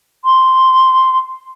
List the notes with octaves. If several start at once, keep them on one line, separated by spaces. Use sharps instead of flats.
C6